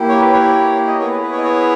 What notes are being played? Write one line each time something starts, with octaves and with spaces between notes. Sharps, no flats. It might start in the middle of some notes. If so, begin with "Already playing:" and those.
Already playing: A#3 E4 G4
C#5
B4
C#5
D#5
B3 E4 G#4 C#5
B4
B4
C#5
D#5
C#5